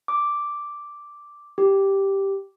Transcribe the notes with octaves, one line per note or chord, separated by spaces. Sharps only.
D6
G4